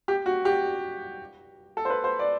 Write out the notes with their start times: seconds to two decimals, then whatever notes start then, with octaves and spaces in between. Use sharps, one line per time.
0.08 G4
0.26 F#4
0.45 G4
1.77 A4
1.85 C5
1.90 B4
2.04 C5
2.19 D5